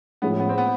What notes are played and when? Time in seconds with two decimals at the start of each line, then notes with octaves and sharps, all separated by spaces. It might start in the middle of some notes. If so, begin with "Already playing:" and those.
0.22 A2 F3 G#3 B3 C#4
0.40 B3
0.49 C4
0.58 B3